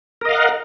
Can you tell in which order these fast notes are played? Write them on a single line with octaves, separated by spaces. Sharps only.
A#4 D#5 F5 F#5